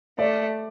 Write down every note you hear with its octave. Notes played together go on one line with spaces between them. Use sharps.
A3 D5